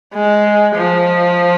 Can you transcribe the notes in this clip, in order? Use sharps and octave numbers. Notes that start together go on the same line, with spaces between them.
G#3
F3